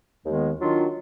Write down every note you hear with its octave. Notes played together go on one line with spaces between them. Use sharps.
D#2 D#3 G#3 B3
D#3 F#3 D4 F4